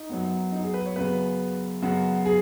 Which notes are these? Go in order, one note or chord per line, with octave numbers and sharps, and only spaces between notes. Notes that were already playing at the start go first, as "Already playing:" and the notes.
Already playing: D#4
F#2 F#3 B3
D#4
G#4
B4
C#5
F#2 C#3 B3 B4
F#2 C#3 B3 F#4
G#4